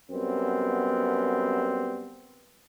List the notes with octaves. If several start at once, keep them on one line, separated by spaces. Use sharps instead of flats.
F#2 G3 B3 C4